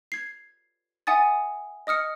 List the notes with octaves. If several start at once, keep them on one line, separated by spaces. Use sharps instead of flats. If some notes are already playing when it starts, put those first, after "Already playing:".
G#6 C7
E5 F#5 G#5 D#6 A6
D#5 D#6 F6 C#7